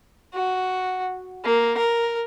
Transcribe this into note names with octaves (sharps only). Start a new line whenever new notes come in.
F#4
A#3
A#4